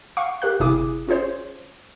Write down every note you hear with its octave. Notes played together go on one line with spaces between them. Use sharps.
F5 F#5 C#6
G4 A#4 F5 F#6
G1 C3 E4 G#4 D6 D#6
C#4 F4 G#4 C5 C#5